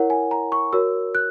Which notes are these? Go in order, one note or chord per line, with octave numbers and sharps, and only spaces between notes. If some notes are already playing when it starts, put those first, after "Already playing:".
Already playing: E4 A#4 C#5 F#5
G#5
A#5
C#6
F#4 A#4 C#5 E6
F#6